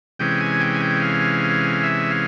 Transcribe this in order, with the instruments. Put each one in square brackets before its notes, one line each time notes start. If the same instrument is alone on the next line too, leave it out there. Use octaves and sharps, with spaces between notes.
[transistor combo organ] C3 E3 G#3 C#4 G5
G#5
G5
G#5
G5
F5
E5
F5